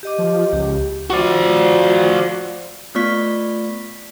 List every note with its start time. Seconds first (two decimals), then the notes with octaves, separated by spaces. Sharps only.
0.03 G4 D#5 D6
0.18 F3
0.53 C#2 G4
1.10 F3 F#4 D5
2.95 A3 B3 F4 D5 C#6 B6